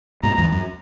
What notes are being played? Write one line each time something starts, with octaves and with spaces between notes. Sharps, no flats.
G#2 B2 A#5
E2 G#2
F#2